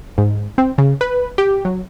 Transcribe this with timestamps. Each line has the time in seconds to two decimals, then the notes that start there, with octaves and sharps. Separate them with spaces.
0.18 G#2
0.58 C4
0.78 C#3
1.01 B4
1.38 G4
1.65 F#3